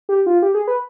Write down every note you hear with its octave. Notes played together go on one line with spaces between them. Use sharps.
G4
F4
G4
G#4
B4